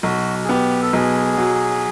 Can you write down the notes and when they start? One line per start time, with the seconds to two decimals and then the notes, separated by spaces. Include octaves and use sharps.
0.03 B1 F#4
0.44 G#4
0.49 B3 G4
0.82 A4
0.93 B1 G#4
1.37 F#3